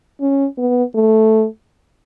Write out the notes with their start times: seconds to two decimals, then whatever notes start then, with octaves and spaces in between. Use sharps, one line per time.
0.21 C#4
0.58 B3
0.94 A3